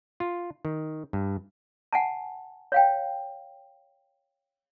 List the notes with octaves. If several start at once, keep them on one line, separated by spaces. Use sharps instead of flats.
F4
D#3
G2
F#5 G#5 A5
C#5 F5 G5